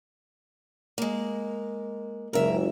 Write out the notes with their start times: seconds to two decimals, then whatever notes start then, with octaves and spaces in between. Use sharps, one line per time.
0.98 G#3 A#3
2.33 F#1 C#2 A#4 E5